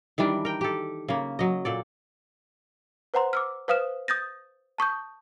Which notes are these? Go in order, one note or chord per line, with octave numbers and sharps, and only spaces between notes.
D#3 E3 G3 D4
A#4 G5
G4 A4
C#3 A#3
F#3 D#5
A#2 A4 D5
B4 C5 F#5 A#5 C6
D6 E6 F6
B4 C5 F5 D#6 F6 E7
D#6 G6 A6 A#6
A5 C#6 D#6 G6